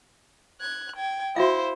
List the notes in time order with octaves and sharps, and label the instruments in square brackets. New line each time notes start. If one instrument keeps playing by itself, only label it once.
[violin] F#6 G#6
G5 G#6
[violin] E4 C5 [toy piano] F#4 E5 F5